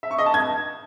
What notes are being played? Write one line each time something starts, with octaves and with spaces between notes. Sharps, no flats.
E5
C#6
D#5
A5
G#6